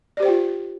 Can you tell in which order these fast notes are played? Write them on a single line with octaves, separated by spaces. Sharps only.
D5 G4 C5 G5 F4